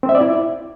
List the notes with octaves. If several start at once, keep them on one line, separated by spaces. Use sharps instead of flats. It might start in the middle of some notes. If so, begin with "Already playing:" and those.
C4
E5
D5
E4